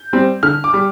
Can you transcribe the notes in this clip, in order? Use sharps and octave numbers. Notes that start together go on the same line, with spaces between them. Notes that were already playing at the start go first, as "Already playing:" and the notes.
Already playing: G6
G3 C4
D3 F6
D6
G3